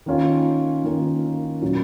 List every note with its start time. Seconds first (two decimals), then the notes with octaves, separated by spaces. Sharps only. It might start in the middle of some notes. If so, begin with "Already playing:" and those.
0.06 D#3 A#3 C#4 F4
0.84 D#3 A#3 C#4 F4
1.61 A#2 F#3 C#4